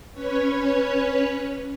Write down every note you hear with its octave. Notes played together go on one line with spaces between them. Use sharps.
C#4 B4 C#5